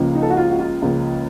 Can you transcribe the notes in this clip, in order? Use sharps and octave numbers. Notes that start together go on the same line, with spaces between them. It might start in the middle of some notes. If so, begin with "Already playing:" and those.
Already playing: C#2 C#3 F3 A#3
D#4
A4
F#4
F4
F#4
F4
C#2 C#3 F3 A#3